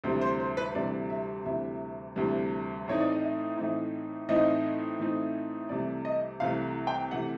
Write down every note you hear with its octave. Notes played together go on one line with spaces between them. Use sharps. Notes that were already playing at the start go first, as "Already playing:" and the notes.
D2 C3 E3 G3 C5
C5
C5
B4
D2 C3 E3 G3 D5
E5
D2 C3 E3 G3 E5
D2 C3 E3 G3
A2 E3 A3 C4 D#4 C#5
D5
D#5
E5
A2 E3 A3 C4 D#4
A2 E3 A3 C4 D#4 D#5
A2 E3 A3 C4 D#4
C2 C3 E3 A3 D5
D#5
C2 C3 E3 A3 F5
G5
C3 E3 A3 F#5